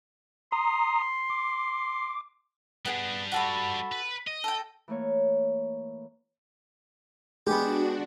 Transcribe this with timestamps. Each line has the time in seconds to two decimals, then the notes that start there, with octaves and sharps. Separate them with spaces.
0.52 A#5 C6 D#6
1.30 D6
2.85 G3 B3 D4 G#4
3.32 F#4 A4 B5
3.92 B4
4.27 D#5
4.44 A4 G5
4.88 E3 A3 A#3 C#5
7.47 G#3 B3 D4 F#4 G4